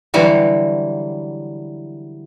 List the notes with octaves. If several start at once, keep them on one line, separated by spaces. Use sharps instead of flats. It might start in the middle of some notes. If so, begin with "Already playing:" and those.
D3 E3 F#3 G3